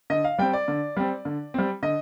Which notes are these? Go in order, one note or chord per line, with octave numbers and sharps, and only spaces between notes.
D3 D#5
F5
G3 C4 G5
D5
D3
G3 C4
D3
G3 C4
D3 D#5